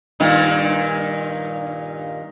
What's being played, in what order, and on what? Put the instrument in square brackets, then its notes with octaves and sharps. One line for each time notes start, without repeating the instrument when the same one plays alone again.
[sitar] G2 A#2 D#3